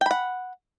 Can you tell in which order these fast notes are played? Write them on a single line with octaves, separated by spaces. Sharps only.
G5 B5 F#5